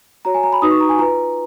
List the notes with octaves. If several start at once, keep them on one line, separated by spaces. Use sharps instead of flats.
F#4 C#5 A#5
G#5
A#5
B5
D#4 F#4 B4 D#6
C#6
A#5
G#5
F4 B4 A#5